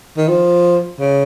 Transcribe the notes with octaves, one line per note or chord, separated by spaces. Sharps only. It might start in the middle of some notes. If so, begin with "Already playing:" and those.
D#3
F3
C#3